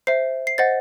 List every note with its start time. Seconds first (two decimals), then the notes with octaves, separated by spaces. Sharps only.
0.07 C5 E5 C7
0.47 C7
0.58 C5 D#5 F#5 A6